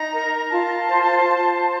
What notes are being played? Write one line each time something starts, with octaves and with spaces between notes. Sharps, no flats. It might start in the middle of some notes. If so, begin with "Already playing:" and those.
Already playing: D#4 A#5
A#4
F4 A5
C5
C5